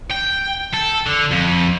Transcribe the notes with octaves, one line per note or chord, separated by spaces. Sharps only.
G5
A4
D3
F2